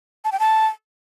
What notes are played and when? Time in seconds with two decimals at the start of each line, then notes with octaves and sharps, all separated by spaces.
0.25 A5
0.32 G5
0.40 A5